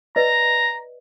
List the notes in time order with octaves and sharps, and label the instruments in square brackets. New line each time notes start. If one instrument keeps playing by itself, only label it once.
[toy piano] B4 D5 D#5 [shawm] A#5